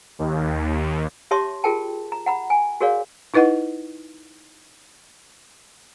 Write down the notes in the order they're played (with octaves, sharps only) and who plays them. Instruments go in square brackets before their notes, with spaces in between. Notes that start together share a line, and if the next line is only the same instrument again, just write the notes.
[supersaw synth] D#2
[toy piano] G4 C#5 E5 A5 C6 D6
F4 G#4 A#4 G5 A5
A#5
F#5 A#5 B5
G#5
F#4 G#4 A#4 C#5 D5 F5
[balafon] D#4 E4 B4 D#5 F#5